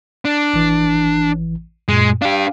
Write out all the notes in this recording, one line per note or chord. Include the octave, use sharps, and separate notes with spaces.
D4
A1 E3
F#2 A#2 G#3
D4 G4 F5